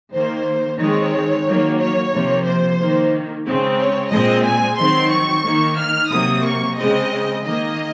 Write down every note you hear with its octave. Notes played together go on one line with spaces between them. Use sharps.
D#3 A#3 C5
D#3 G#3 C4 C#5
D#3 F#3 A#3
C#5
C3 F3 A#3
C5
D#3 A#3
C#3 G#3 C4
C#5
A#2 G#3 C4 D#5
G#5
D#3 F#3 C4 C6
C#6
D#3 A#3
F6
C3 F#3 A#3 D#6
C#6
C#3 G#3 C4 D#5
D#3 A#3 D#5